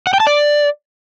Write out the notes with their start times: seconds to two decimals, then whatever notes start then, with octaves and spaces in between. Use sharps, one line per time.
0.07 F#5
0.13 G5
0.20 A5
0.27 D5